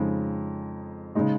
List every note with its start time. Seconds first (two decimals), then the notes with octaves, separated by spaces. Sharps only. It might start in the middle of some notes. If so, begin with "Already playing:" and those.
Already playing: F2 C#3 G#3 D#4
1.15 C#3 G#3 D#4